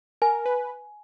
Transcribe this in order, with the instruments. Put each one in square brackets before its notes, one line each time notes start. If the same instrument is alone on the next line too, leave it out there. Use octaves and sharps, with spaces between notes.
[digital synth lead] A#4 [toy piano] G#5
[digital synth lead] B4